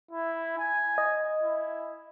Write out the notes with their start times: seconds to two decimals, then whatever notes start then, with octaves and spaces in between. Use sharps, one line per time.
0.11 E4
0.58 G#5
0.98 D#5
1.43 E4